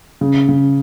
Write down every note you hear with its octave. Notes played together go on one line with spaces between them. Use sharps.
C#3
C#3